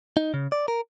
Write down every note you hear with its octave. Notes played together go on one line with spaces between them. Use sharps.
D#4
C#3
D5
A#4